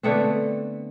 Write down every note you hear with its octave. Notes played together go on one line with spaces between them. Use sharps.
D3 A3 B3 C4